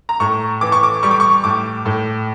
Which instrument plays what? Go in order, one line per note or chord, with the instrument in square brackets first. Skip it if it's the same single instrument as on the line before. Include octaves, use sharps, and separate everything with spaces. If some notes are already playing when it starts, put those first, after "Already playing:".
[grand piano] A#5
A2 C#6
E3 D6
C#6
D6
G3 C#6
D6
C#6
A2 D6
A2